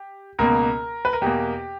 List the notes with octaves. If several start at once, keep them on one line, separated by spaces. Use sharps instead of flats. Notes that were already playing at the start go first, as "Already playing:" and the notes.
Already playing: G4
C#2 B2 A#3 A#4
B4
A#4
E2 B2 A#3 G4